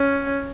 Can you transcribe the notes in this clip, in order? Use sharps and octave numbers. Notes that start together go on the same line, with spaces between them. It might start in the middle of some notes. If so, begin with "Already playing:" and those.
Already playing: C#4